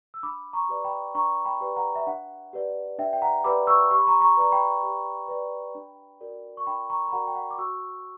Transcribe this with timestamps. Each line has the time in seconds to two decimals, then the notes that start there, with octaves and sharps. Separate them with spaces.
0.14 E6
0.23 D4 B5 D6
0.53 A#5 C#6
0.69 G4 B4 D5
0.84 G5 B5
1.15 D4 A#5 C#6
1.45 G5 B5
1.61 G4 B4 D5
1.76 F#5 A#5
1.95 E5
2.07 D4 F#5
2.53 G4 B4 D5
2.99 D4 E5 G5
3.13 G5
3.22 F#5 A#5
3.44 G4 B4 D5 B5 D6
3.67 C#6 E6
3.91 G4 C#6
3.99 B5
4.07 A#5 C#6
4.21 A#5 C#6
4.37 B4 D5 A#5
4.52 G5 B5
4.83 G4
5.28 B4 D5
5.75 D4
6.21 F#4 A#4 D5
6.57 C#6
6.67 D4 G5 B5
6.90 A#5 C#6
7.08 B5
7.12 F#4 A#4 D5 F#5 A#5
7.27 G5
7.35 F#5
7.50 D6
7.58 F#4 C#6 E6